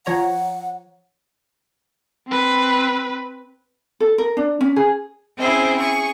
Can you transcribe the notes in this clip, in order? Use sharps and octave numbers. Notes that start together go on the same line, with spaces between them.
F3 C#5 F#5 A#5
C4 B4
A4
A#4
D4
C#4
G#4
C4 C#4 E4 G#4 C5
G#4 C#6